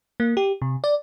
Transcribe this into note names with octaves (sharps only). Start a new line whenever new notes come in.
A#3
G4
C3
D5